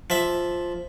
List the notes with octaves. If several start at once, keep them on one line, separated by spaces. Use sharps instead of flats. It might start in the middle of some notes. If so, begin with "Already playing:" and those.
F3 E5